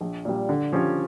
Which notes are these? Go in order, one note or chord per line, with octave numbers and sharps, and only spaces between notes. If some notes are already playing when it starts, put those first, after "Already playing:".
A#1
A#2 G3
D3
F3 C#4 G4 C#5